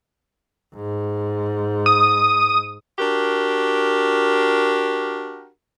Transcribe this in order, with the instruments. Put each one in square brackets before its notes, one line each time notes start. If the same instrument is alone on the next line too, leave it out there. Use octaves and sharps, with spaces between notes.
[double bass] G#2
[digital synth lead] D#6
[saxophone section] D4 F#4 G4 A#4